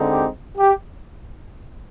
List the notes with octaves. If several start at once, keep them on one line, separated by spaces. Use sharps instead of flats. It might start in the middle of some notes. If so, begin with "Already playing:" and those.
Already playing: D3 G#3 C4 D#4
G4
G4